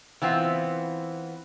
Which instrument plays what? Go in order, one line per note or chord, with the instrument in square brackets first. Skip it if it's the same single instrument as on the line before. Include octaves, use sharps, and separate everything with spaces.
[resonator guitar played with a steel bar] E3 B3 C4 F4